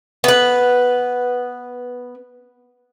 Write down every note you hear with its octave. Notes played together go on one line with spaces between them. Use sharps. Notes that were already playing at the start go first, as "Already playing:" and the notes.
B3 B4